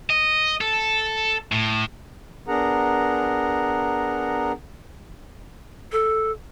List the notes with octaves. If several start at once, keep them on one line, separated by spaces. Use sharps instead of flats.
D#5
A4
A2
B3 D4 G#4 A#4 F#5 A#5
A4